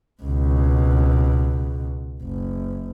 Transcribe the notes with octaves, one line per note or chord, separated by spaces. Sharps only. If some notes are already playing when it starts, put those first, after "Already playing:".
C#2 B2
F#1